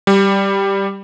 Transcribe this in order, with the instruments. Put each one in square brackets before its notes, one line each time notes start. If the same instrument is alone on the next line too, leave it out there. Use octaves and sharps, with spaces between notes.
[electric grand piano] G3